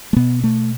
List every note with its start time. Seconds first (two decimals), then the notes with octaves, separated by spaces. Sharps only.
0.13 A3
0.16 B2 B3
0.44 A3